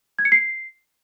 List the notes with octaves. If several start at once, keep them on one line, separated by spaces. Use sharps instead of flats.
G#6
C#7
C7